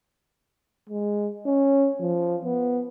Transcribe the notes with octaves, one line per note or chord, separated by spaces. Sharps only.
G#3
C#4
F3
B3